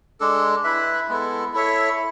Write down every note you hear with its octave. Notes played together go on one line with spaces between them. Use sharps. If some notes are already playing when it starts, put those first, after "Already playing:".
G#3 D4 A4
E4 B4 E5
G#3 B3 E4 A4
E4 A4 C#5 E5